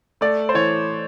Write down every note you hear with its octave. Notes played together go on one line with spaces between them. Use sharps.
A3 D5
C5
E3 C#5